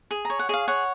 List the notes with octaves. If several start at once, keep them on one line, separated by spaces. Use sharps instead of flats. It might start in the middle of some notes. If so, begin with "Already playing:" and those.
G#4
C#5 A#5
F#5
G#4 D#5 F5
C#5 F#5